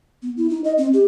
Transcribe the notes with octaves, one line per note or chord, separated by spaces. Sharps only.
B3
E4
D#4
D#5
C4
G4